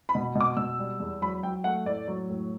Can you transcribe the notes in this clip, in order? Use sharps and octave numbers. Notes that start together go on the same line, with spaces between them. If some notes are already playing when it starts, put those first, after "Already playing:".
B5
B2
B2
D6
B2 E6
G3
E2
F#3 B5
F#3 G5
A3 F#5
A2 D5
F#3
A2